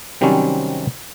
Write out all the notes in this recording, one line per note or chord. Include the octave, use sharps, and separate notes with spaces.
C3 D#3 F#3 G3 C4 C#4